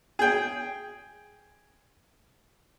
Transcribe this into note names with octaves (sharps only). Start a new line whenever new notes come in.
G#4 G5